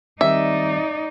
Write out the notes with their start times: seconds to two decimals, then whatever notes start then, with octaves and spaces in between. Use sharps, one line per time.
0.21 D#3 G3 C4 D#4 D5 E5